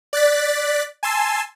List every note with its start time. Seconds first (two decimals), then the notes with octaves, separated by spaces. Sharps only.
0.13 D5 F#6 A6 B6
1.03 G#5 A5 C6 E6